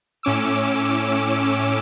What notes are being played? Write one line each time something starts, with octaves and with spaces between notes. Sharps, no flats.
A2 C#4 D6 E6